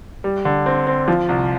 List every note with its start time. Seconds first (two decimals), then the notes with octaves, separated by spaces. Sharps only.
0.24 G3
0.45 D3
0.66 C4
0.87 C4
1.08 F3
1.29 C2